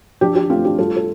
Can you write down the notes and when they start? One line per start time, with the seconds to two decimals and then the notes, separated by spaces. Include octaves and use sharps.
0.21 F3 D4 G4
0.35 D4 G4
0.50 A3 C4 F4
0.64 D4 G4
0.78 G3 F4 A4
0.97 A4